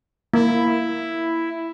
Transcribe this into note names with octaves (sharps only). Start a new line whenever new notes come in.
A#3 E4